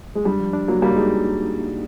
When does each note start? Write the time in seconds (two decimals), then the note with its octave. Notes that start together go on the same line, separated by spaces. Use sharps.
0.15 G#3
0.25 G3 D4
0.40 F3
0.53 D4
0.68 F#3 A#3
0.82 G3 A#3
0.96 G#3 D#4